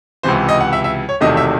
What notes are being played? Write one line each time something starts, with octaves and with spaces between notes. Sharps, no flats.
C#2 C3 E3 C5
D#5
F#5
E5
E5
C#5
E1 E2 C3 D#3 A3 D#5
E5